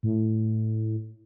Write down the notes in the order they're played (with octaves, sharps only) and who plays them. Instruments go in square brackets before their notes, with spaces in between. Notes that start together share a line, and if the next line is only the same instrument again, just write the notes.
[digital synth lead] A2